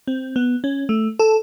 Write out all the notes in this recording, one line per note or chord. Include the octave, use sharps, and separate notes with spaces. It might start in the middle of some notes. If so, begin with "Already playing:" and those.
C4
B3
C#4
A3
A4